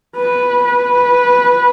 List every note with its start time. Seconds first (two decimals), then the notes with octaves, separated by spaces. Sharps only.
0.17 B4
0.64 B4